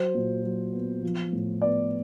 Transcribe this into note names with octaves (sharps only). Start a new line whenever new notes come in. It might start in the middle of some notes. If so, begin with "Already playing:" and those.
Already playing: F#3 C5
A#2
F#3
B3
F3
A2
B3 D5